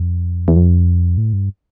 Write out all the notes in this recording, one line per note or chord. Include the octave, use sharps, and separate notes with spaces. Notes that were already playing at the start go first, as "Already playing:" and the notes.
Already playing: F2
E2
F2
A2
G2